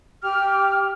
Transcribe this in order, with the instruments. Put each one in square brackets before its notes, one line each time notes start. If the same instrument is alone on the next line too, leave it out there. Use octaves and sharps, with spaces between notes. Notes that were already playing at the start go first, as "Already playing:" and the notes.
[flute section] G4 G5 D6 F6